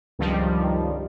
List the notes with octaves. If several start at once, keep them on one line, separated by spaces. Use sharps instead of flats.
C#2 G2 D#3 F3 G3